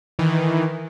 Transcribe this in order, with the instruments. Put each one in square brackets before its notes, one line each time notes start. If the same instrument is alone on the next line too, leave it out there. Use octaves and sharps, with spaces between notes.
[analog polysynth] D#3 E3